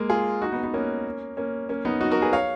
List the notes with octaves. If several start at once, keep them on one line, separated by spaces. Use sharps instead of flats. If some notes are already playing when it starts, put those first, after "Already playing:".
Already playing: G#3 A#3
F4 G#4
D#4 F#4
B3 D#4
B3 D#4
A#3 C#4
A#3 C#4
A#3 C#4
B3 D#4
D#4 F#4
F#4 A#4
G#4 B4
C#5 F5